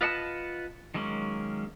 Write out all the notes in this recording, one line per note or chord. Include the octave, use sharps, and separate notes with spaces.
F4 B4 D#5 F#5 A5
D#3 F#3 G#3 A#3 C#4